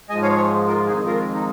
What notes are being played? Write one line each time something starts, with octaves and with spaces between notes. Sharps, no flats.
G#2 F3 G#3 D#5 G#5
C#5 F5
G#4 C#5
F4 A#4
F2 D#3 G#3 D#4 G#4
F4 A#4
D#4